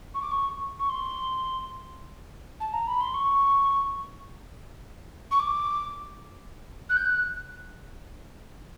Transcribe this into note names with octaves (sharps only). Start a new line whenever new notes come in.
C#6
D6
C#6
C#6
C6
A5
A#5
B5
C6
C#6
C#6
D6
F#6
G6
F#6